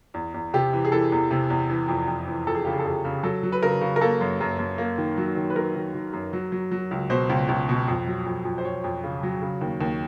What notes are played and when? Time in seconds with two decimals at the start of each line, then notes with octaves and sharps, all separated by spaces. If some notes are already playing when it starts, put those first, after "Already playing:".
0.14 E2
0.34 E2
0.54 C3 G4
0.73 E3
0.85 G#4
0.92 E3 A4
1.12 E2
1.31 C3
1.50 E2
1.70 E3
1.88 F2
2.08 F2
2.27 E3
2.47 F2 A4
2.55 G#4
2.65 C#3 G4
2.73 G#4
2.79 A4
2.85 F2 G#4
3.05 C#3
3.23 F#3 A4
3.43 F#3
3.52 B4
3.63 C#3 A#4
3.81 C#3
3.96 A#4
4.01 A#3 A4
4.21 F#2
4.40 F#2
4.59 F#2
4.78 A#3
4.98 D#3
5.17 F#3
5.36 D#3
5.50 B4
5.56 F#3 A#4
5.75 D#3
5.94 D#3
6.13 F#2
6.33 F#3
6.52 F#3
6.72 F#3
6.91 C#2
7.10 B2 C5
7.29 C#2
7.48 C#2
7.69 B2
7.88 F2
8.07 F#3
8.26 F2
8.45 F2
8.58 C5
8.65 F2 C#5
8.84 F2
9.04 C#3
9.23 F#3
9.42 C#3
9.61 D#2
9.81 D#2